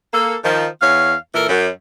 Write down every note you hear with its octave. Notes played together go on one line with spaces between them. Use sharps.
A#3 A4
D#3 F3
E2 C#5 F5
A#2 E3 A4 A#4
F#2